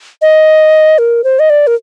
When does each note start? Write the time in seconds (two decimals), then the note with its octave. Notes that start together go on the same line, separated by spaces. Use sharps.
0.22 D#5
0.98 A#4
1.24 C5
1.39 D#5
1.50 D5
1.67 A#4